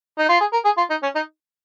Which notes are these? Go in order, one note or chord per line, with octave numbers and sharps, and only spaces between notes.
D#4
F4
G#4
A#4
G#4
F4
D#4
C#4
D#4